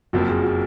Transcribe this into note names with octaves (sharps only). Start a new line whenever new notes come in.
F#1 F2 F3 A#3 F#4
G#4
F#4